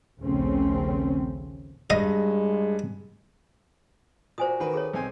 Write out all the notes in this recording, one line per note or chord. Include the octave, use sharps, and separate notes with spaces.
A#1 D#2 C#3 A3 C4 C#4
G2 G#3 D#5
A#2 F#4 C5 G#5 D#6
D#3 F#4 B4
G#4 A4 C#5
B1 C4 G#5